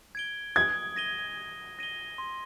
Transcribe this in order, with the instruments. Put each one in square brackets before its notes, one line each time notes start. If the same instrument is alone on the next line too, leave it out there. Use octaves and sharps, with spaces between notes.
[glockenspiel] G#6 D7 G7
[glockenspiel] D#6 [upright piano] G#6
[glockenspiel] A#6 D#7 G7
D#6
A#6 D#7 G7
C6